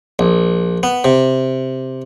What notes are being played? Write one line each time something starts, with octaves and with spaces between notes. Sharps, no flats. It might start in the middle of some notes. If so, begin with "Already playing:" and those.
A#1
B3
C3